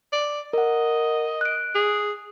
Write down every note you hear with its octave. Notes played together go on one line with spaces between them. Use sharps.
D5
A#4 D#5 F#5
F#6 D7
G#4